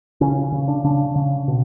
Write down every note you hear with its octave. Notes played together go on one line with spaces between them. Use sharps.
C#3 C#4
C#3
D4
C#3 D4
C#3
B2